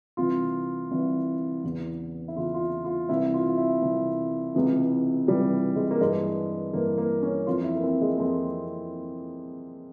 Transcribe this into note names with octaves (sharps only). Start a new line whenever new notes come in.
C2 C3 E3 F4
C2 C3 E3 E4
E2 C#3 E3
E4
E2 C#3 E3 F4
F4
E4
F4
C2 C3 E3 E4
F4
F4
E4
C2 C3 E3
C#2 C3 E3
C#2 C3 E3 G3
G#3
A#3
G2 E3 G#3
G2 E3 A#3
A#3
C#4
F2 E3 F4
E4
A#3
C4
G#3
A#3
F2 E3 C4